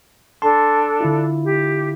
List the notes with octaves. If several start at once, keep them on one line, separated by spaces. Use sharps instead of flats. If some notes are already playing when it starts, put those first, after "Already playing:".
D4 A4 A5 C6
D3 E4 F4
G4